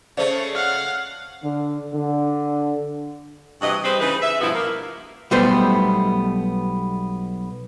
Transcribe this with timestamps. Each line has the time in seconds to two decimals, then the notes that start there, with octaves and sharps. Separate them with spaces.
0.17 C#3 A3 C5 D5
0.54 F5 F#5
1.43 D3
1.93 D3
3.61 G2 C3 E3 F#4 D#5
3.83 G3 C4 G#4 B4 C5
4.00 C#3 E3 D#4 G#4 B4
4.22 E5
4.40 G2 B2 F3 B3 E4 F#4
4.54 A#3
5.31 B1 B2 G3 A3 B3 C5